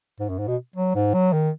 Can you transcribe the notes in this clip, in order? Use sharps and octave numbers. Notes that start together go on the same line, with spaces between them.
G#2
F#2
G#2
B2
F#3
G#2
F#3
D#3